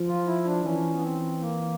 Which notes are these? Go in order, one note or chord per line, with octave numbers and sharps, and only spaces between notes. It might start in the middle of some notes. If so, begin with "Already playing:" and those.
Already playing: F3
F4
E4
D4
E3 C#4
B3
C4
A#3